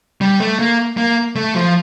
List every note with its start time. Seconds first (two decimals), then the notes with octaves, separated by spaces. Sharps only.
0.21 G3
0.40 A3
0.59 A#3
0.97 A#3
1.36 A3
1.55 F3